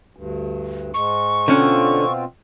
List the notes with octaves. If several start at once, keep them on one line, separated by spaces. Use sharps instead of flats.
D2 G2
G#2 G#3 C#6
B2 D3 C4 C#4 F4